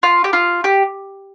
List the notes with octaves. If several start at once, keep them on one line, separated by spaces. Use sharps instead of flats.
F4
G4
F4
G4